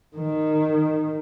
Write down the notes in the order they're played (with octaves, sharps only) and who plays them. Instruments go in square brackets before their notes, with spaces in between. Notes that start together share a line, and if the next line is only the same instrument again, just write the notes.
[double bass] D#3